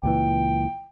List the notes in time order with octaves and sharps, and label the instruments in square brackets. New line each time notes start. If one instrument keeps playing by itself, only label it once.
[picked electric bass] C#2 A#2 E3 [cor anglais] G5